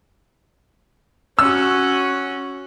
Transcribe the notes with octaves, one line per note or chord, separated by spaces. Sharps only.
C#4 F#4 E6